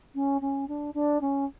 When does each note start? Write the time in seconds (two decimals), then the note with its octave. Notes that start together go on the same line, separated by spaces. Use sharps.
0.15 C#4
0.41 C#4
0.68 D4
0.94 D4
1.21 C#4